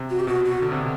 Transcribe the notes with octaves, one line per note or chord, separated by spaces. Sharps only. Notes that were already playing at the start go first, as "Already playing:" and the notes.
Already playing: C3
F#4
G4
B2 F#4
F#4
D3
C3
B2